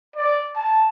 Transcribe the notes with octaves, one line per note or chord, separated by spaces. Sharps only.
D5
A5